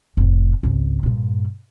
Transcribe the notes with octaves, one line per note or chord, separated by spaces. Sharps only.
F1 A2
G#1 C#2
G2 A#2